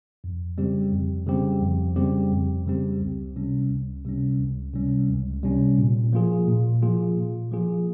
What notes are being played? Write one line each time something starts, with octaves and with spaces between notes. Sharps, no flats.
F2
C#3 G3 C4 G4
F2
C#3 G3 C4 G4
F2
C#3 G3 C4 G4
F2
C#3 G3 C4 G4
C#2
C3 G3 C#4
C#2
C3 G3 C#4
C#2
C3 G3 C#4
C#2
C3 G3 C#4
A#2
F3 A#3 F4 G#4
A#2
F3 A#3 F4 G#4
A#2
F3 A#3 F4 G#4